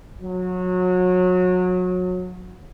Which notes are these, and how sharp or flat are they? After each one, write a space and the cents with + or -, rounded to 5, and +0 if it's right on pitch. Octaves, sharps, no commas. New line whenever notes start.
F#3 -25